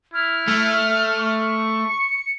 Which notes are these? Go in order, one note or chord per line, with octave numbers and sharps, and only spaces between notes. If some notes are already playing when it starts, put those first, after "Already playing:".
E4 F6
A3
C#6
C#7